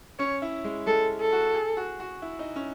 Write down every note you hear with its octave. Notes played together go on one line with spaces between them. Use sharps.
C#4 C#5
E4
G#3
G#3 A4
A4
F#4
G#4
F#4
F#4
E4
D#4
C#4